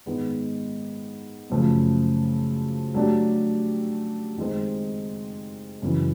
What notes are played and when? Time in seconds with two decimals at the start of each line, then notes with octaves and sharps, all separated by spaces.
0.06 G#2 D#3 G#3 B3
1.50 F#2 C#3 F3 A3
2.94 F#3 A3 D4 G4
4.38 D#3 G#3 C4
5.82 F#2 C#3 E3